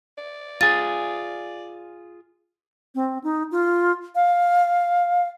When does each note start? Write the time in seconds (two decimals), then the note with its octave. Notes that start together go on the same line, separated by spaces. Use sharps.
0.18 D5
0.61 F4 G#4 A6
2.95 C4
3.24 D#4
3.51 F4
4.15 F5